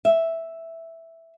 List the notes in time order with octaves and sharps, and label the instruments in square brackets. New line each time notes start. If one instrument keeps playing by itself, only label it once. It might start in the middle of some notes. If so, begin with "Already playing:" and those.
[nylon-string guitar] E5